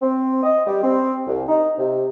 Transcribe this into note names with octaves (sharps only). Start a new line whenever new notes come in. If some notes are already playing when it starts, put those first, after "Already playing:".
C4
D#5
G3
C4
C2
D#4
C3